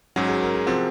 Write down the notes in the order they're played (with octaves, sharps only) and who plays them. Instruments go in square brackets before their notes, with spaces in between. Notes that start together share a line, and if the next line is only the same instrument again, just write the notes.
[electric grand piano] G#2 F#3 C#4 [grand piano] F#4
[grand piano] G#4
A#4
G#4
[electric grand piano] C3 F3 C4 [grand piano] F#4